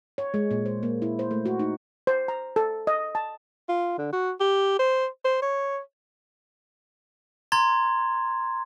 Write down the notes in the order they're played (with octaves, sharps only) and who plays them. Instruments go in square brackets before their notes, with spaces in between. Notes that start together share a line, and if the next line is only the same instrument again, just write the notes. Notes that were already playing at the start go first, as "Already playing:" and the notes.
[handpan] C#5
G#3
A#2
C5
A#3
E4
C5
A3
F#4
D#4
[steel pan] C5
A#5
A4
D#5
A5
[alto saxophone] F4
D3
F#4
G4
C5
C5
C#5
[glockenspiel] A#5 C6 G#6 A6